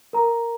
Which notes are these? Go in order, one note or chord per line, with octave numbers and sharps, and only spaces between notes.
A#4 A#5